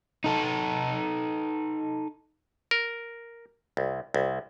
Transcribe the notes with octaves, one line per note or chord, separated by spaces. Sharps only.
D#4 A4
A#4
C2
C2